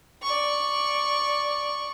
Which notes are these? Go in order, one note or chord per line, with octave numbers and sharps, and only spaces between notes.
D5 C#6